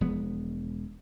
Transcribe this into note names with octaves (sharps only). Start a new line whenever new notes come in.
E1 F3 G#3 B3